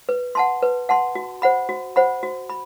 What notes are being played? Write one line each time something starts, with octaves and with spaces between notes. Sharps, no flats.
B4
F#5 A5 C6
B4
F#5 A5 C6
F#4
C5 F#5 B5
F#4
C5 F#5 B5
F#4
B5